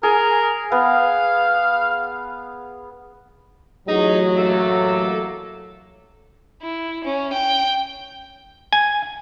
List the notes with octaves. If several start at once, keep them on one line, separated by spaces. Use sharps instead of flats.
G#4 A#4
B3 F5
A1 F#3 D#4 G#4
A3 A#3 A4
E4
C#4
G5
G#5